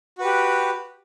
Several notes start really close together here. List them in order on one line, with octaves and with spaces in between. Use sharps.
F#4 B4 G4